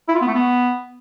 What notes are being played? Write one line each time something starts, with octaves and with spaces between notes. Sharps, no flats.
E4
F4
B3
A3
B3